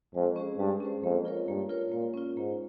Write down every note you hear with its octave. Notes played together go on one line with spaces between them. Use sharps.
F2 G#3
C#4 G#4 C5
G2 G#3
C#4 G#4 C5
F2 A#3
F4 A#4 C#5
G2 A#3
F4 A#4 C#5
A#2 A#3
C#4 F4
G#2 A#3